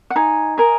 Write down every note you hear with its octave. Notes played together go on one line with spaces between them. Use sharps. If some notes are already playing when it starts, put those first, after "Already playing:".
F#5
D#4 G#5
A#4 D#5 G#5